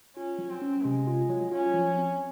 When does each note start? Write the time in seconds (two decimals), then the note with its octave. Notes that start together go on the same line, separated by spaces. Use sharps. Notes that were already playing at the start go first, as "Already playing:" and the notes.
0.16 C#4 F4
0.38 F#3
0.50 C4
0.62 C#4
0.84 C3 G#3
1.07 F4
1.29 F#3
1.52 C#4 F4
1.74 F3
1.97 C4